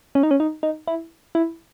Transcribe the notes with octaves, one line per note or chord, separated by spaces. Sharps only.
C#4
D#4
C#4
D#4
D#4
E4
E4